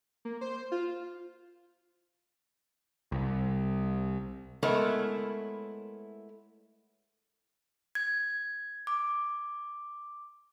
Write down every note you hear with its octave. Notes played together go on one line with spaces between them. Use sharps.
A#3
C5
F4
C2
G#3 A3 B3 E4 A#4 C#5
G#6
D6